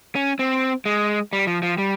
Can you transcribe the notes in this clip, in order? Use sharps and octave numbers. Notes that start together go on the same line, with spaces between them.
C#4
C4
G#3
G3
F3
F3
G3